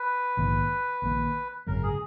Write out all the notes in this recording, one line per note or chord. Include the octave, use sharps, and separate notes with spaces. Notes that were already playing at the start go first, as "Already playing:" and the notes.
Already playing: B4
A#1 G#2 D#3 A#3
A#1 G#2 D#3 A#3
G#1 F#2 C#3 A#4
G#4